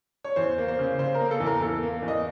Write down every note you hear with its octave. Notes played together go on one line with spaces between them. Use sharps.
C#5
E2 C5
A#3
C5
C#3
C#3 C5
A#4
A#3
A4
E2
A#4
E2 A4
A#3
E2
D#5